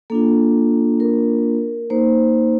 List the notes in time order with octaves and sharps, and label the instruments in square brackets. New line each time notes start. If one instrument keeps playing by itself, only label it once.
[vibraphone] A#3 D4 F4 A4
A#4
A#3 D#4 C5